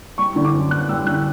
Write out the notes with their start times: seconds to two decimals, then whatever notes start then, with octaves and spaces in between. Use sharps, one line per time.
0.18 G3 C#6
0.36 D3
0.45 D6
0.54 F#2
0.71 B3 F#6
0.89 G3 E6
1.07 D3 F#6